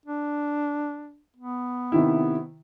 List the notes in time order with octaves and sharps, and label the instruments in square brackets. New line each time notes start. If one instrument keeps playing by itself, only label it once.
[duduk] D4
B3
[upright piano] C3 D#3 E4